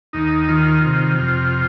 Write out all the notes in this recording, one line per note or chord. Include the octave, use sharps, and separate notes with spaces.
D#2 D#4
D#3 F4
C3
F2